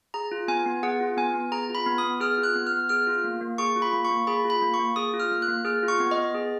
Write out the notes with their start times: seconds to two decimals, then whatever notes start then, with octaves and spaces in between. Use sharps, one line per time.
0.14 G#4 A#5
0.31 F4
0.48 B3 G#5
0.66 B3
0.83 G#4 F#5
1.00 F4
1.17 B3 G#5
1.34 B3
1.52 G#4 A#5
1.69 F4
1.75 B5
1.86 B3
1.98 D#6
2.03 B3
2.20 G#4 F6
2.38 F4
2.43 F#6
2.56 B3
2.67 F6
2.72 B3
2.89 G#4 F6
3.07 F4
3.24 A#3
3.41 A#3
3.58 G#4 C#6
3.76 F4
3.82 B5
3.93 A#3
4.05 C#6
4.11 A#3
4.27 G#4 B5
4.44 F4
4.50 B5
4.62 A#3
4.74 C#6
4.79 A#3
4.96 G#4 D#6
5.14 F4
5.20 F6
5.31 A#3
5.42 F#6
5.48 A#3
5.65 G#4 F6
5.83 F4
5.88 C#6
6.00 B3
6.11 D#5
6.17 B3
6.34 G#4